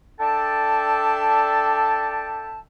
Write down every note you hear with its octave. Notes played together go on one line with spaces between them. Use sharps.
D4 A4 D5 E5 G5 A5